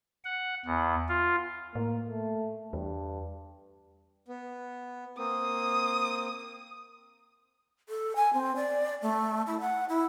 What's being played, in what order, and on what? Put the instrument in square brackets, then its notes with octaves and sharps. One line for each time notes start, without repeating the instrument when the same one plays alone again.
[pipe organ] F#5
E2
F4
[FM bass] A2 [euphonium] A#3
[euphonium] A3
[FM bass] E2 [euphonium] G2
[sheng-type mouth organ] B3
[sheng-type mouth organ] A#3 C4 [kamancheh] D#6
[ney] A4
G#5
C4
D5
A3
E4
F#5
E4